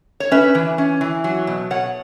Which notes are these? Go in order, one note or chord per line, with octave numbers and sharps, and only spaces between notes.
C#5
C#4 B4 E5
E3
C#4
E3
F#3
B2
B2 C#5 F#5